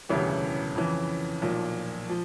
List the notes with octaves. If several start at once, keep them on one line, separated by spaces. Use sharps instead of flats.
E1 D2 C#3 E3 G3
F2 C#3 E3
B1 A#2 F3
F3